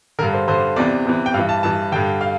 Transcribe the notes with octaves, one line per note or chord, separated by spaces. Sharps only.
G2 D3 A#4
C5
G2 D3 C5
E2 C3 E3 D5
E2 C3 E3
G5
G2 E3 F5
A5
G2 E3 A5
G2 D3 G5
F5